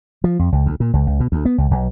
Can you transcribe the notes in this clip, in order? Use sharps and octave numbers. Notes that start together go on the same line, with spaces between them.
F3
F2
C#2
D2
A#2
C#2
C#2
B2
D2
B3
C#2
B1